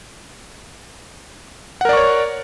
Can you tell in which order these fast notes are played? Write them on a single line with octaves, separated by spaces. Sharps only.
F#5 A#4 D5 C#6 C#5